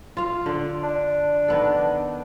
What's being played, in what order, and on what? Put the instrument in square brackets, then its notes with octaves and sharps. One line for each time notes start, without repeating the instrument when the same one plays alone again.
[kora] F4 F5
D3 D5
[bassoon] D4
[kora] D#3 B3 A4